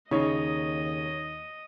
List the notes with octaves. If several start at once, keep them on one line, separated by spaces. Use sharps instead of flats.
D#2 C#3 D#4 C#5 D#5